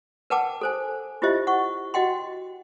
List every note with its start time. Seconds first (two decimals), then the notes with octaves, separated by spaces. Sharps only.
0.30 A#4 B4 F#5 G5 A5 D6
0.61 A4 C5 G#5
1.22 E4 F4 G4 C5 D#5 E5
1.47 F#5 C#6
1.94 F#4 D#5 F#5 G5 C6